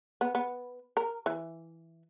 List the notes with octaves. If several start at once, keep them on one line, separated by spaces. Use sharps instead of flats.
B3
B3
A#4
E3